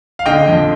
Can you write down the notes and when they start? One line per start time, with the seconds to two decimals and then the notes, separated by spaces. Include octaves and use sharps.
0.19 F5
0.26 D3 D#5 G5
0.48 F2